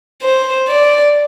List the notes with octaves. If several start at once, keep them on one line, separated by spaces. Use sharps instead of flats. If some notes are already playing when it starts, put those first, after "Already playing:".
C5
D5